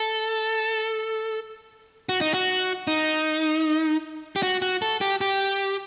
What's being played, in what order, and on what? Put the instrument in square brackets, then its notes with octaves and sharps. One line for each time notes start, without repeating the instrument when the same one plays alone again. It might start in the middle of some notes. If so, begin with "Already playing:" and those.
Already playing: [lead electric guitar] A4
F#4
D#4
F#4
D#4
G4
F#4
F#4
A4
G4
G4